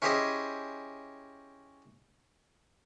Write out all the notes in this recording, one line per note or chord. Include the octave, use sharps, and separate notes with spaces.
C#4 E4 G4 G#4 C5 D#5